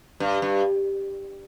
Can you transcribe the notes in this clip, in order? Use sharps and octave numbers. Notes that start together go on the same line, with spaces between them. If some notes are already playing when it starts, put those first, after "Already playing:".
G2
G2